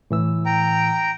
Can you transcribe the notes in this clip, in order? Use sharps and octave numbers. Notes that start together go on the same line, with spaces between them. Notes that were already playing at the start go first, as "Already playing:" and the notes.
A2 E3 E6
G5 A#5